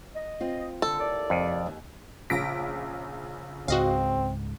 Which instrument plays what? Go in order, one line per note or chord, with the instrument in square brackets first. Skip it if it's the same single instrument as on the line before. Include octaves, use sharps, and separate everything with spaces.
[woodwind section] D#5
[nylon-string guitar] C4 F4
[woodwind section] D3 [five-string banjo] A4
[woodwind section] D#2 A2 D5
[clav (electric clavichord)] F2 [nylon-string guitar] C3
[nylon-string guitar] D#2 G#5
[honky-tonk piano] A#1 C#3 B6 [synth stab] A#6 D7
[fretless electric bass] C#2 G#2 [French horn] C4 [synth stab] F#4 D#5 F5